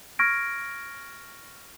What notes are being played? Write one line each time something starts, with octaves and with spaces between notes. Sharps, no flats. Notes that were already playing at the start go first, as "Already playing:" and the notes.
C#6 F6 G#6 A#6 D7